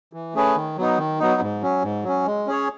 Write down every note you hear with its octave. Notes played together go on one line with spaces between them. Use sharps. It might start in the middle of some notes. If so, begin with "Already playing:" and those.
E3
A3 C#4 G#4 B4
D#3
F#3 B3 D#4
D#3
F#3 B3 D#4
G#2
F#3 C#4
G#2
F#3 C#4
G#3
C#4 G#4 C#5